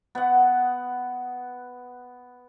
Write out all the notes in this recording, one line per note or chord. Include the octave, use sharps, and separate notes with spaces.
B3 F#5